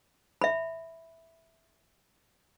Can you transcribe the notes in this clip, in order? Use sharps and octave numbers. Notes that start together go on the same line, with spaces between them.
E5 B5